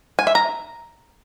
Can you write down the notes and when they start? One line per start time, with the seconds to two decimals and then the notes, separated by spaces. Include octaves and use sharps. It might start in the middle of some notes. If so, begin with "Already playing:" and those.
0.19 G#5
0.27 E5
0.35 A#5